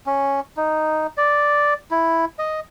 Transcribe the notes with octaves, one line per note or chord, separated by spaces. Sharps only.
C#4
D#4
D5
E4
D#5